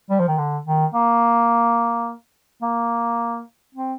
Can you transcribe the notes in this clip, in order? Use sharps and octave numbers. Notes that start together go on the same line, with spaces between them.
G3
F3
D#3
D3
D#3
A#3
A#3
C4